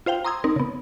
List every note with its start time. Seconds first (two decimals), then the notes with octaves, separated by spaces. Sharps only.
0.06 F4 C5 F5 G5
0.25 A#5 C6 D#6 E6 G#6
0.44 C4 D#4 A#4
0.56 C#3 B3